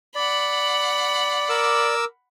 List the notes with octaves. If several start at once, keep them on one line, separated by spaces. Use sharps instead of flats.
D5 F#5 B5
A#4 D6 E6